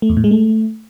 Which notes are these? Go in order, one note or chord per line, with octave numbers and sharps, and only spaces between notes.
A3
E2
A2
G#3
A3